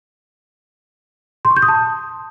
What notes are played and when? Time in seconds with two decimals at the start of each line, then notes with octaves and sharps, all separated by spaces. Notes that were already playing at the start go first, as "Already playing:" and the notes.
1.45 C6
1.51 C#6
1.56 G6
1.62 D#6
1.68 A5